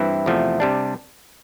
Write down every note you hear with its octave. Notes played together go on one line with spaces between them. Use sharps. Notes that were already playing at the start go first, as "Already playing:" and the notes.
Already playing: G2 E3 C4 E4
E2 C3 F3 A3
C3 G3 D4